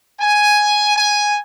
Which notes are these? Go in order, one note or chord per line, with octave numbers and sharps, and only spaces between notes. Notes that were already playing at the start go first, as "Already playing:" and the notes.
G#5
G#5